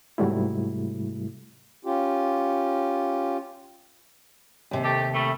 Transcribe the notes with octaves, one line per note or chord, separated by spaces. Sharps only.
G#2 C3 F#3 G3 A3 E4
C#4 F4 G4
D#2 C3
A3 G4
G3 A3